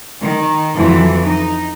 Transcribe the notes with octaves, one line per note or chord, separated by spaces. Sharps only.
D#3
F2 D3 E3 F#3
D#4